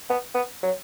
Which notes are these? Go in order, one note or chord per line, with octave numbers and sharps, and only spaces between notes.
B3
B3
F#3